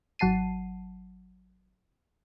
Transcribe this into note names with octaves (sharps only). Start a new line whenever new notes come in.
G#1 F#3 F#5 A5 C7 D#7